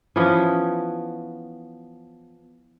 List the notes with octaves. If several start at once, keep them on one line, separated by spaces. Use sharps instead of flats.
E3 F3 B3 C#4